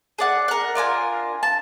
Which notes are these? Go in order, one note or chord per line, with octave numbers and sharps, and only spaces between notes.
G#4 D5 F#5
A#4 F#5
D4 F4 A#4 G#5
A5